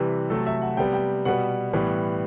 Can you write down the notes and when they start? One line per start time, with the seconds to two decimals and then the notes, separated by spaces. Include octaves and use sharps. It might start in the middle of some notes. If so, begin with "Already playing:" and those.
Already playing: C3 E3 G3 B4
0.30 C3 F#3 A3 A4
0.47 E5
0.62 F#5
0.77 C3 G3 B3 G5
0.94 G5
1.25 B2 G3 B3 F#5
1.73 A2 E3 G3 B3